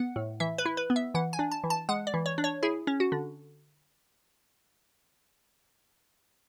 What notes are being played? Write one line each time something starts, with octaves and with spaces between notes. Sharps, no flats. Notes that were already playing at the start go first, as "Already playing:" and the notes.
Already playing: B3 F#5
A2
E3 E5
B4
E4
B4
B3
E5
E3 F#5
G#5
D4
A5
E3
A5
G#3 F#5
D5
E3
C#5
D4
C#5
E4 G#4
C#4
F#4
D3